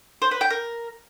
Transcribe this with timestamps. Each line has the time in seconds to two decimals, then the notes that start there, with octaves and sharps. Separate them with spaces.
0.22 C5
0.31 B4
0.41 G5
0.50 A#4